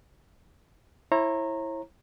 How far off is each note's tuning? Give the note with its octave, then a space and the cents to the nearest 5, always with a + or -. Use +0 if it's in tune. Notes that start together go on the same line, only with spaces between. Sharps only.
E4 +0 C#5 -40 A#5 -10